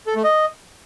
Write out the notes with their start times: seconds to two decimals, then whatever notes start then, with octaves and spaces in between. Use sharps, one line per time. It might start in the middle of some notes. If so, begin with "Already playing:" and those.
0.07 A4
0.15 A3
0.24 D#5